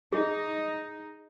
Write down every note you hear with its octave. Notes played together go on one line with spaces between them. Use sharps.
D#4 G#4